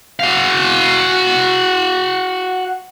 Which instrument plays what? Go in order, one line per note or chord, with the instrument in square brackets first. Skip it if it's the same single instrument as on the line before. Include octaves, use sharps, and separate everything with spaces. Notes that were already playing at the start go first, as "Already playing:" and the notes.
[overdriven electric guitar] F#4 F5